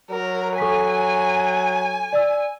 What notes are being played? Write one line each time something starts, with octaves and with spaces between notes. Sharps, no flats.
F#3 A#4
A4 G#5 C#6 B6
D5 E6